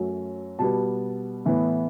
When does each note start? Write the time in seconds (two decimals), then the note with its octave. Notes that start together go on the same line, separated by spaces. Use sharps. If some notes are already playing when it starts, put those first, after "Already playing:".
Already playing: F#2 F#3 A3
0.59 B2 G3 B3 A5
1.45 A2 E3 B3